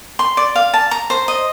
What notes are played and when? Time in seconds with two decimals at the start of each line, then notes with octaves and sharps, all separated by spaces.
0.19 C6
0.37 D5
0.56 F5
0.74 A5
0.91 A#5
1.10 C5
1.28 D#5